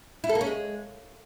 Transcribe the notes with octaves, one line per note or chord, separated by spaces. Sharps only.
E4
A4
A#3
C#4
G#3